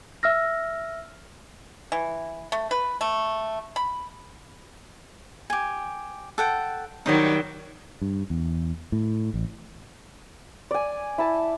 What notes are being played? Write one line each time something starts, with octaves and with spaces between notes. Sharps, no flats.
E5 E6 F6 A#6
E3
A3
B4
A3
B5
G4 G#5
A4 F#5 G5
D#3 F#3 G3 D#4 C5 D#5
G2
E2
A2
A1
D5 G#5
E4 A5